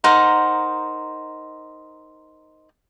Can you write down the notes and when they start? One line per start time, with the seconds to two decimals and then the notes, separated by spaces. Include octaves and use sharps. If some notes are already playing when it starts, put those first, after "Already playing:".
0.04 D#4 A#4 C5 F#5